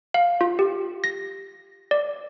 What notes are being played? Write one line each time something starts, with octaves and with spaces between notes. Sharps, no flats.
F5
F4
G4
A#6
D5